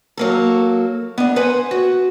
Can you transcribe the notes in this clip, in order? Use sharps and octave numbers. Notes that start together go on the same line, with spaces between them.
F#3 A#3 A4
B3 D4
B4 C5 F#5 G#5
F#4